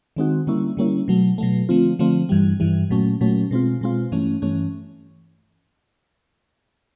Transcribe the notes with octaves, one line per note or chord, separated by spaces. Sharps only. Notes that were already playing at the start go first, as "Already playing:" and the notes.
D#3 G#3 C4 D#4 F#4
D3 G3 A#3 C#4 E4
D3 G3 A#3 C#4 E4
B2 F#3 A3
B2 F#3 A3
D3 F3 A3 C4 F4
D3 F3 A3 C4 F4
G2 E3 G3
G2 E3 G3
A#2 F#3 A3 C#4
A#2 F#3 A3 C#4
B2 G#3 C4 F4
B2 G#3 C4 F4
G2 E3 A3 C#4
G2 E3 A3 C#4